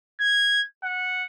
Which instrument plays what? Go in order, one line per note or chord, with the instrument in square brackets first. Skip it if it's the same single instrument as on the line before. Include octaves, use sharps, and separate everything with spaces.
[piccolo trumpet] G#6
F#5